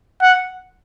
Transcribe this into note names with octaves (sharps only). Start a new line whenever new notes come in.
F#5